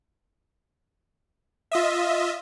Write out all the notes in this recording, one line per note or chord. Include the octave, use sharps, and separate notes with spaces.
F4 D#5 E5